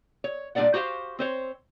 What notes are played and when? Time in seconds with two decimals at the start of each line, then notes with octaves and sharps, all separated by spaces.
0.24 C#5
0.55 A#2 G3 D4 A#4 D5 F#5
0.74 F#4 G4 C5 F5
1.19 C4 C5 C#5